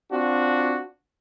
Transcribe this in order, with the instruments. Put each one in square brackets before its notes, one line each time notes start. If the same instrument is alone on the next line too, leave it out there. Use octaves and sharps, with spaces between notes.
[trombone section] C4 D4 F4 F#4